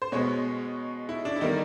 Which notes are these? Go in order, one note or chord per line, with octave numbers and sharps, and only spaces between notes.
C5
B2 G#3 B3 C#5
E4
D4
E4
D#3 G3 A#3 D#4